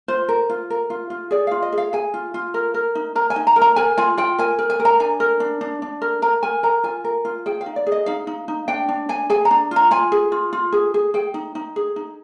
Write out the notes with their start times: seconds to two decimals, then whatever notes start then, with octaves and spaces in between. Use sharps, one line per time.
0.08 F4 C5
0.29 A#4
0.50 F4
0.70 A#4
0.90 F4
1.10 F4
1.31 G#4 D5
1.47 F4 F5
1.62 D#5
1.72 G#4
1.78 F5
1.93 G#4 G#5
2.14 F4
2.34 F4
2.54 A#4
2.74 A#4
2.95 D#4
3.15 A#4 A#5
3.30 G#5
3.36 D#4
3.47 A#5
3.56 A#4
3.62 A#5
3.76 A#4 G#5
3.98 F4 G#5
4.18 F4 G5
4.38 A#4 G#5
4.59 A#4
4.70 G#5
4.80 A#4
4.85 A#5
5.00 D4 G#5
5.20 A#4
5.40 D4
5.61 D4
5.82 D4
6.02 A#4
6.22 A#4 A#5
6.43 A#4 G#5
6.63 A#4 A#5
6.84 F4 G#5
7.04 A#4
7.25 F4
7.46 G#4 G5
7.61 F5
7.66 D#4
7.76 D5
7.87 G#4
7.92 D#5
8.06 D#4 F5
8.27 D#4
8.48 D#4
8.68 D4 G5
8.88 D4
9.09 D4 G#5
9.30 G#4 G#5
9.45 A#5
9.51 D4
9.71 F4 A#5
9.91 F4 G#5
10.12 G#4
10.32 F4
10.53 F4
10.72 G#4
10.94 G#4
11.14 G#4 G5
11.34 D#4
11.55 D#4
11.76 G#4
11.96 D#4